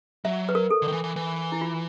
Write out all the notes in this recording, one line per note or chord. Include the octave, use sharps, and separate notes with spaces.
F#3 E5
B4
A#4
A4
D3
D#3
E3
E3
E3
E4
F4